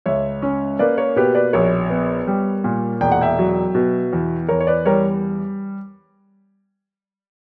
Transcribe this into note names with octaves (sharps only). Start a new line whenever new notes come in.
C#2 C#5 E5
C#4
A#3 B4 D5
A#4 C#5
B2 G4 B4
B4 D5
A#1 A#4 C#5
B3
G3
A#2
E1 G5
F#5
E5 G5
F#3
B2
E2
E2 A#4 C#5
C#5
B4 D5
G3 A#4 C#5